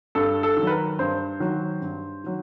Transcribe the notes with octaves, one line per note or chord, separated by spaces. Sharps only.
G2 A4
A4
D#3 F#3
B4
A#4
G2 C5
D#3 F#3
G2
D#3 F#3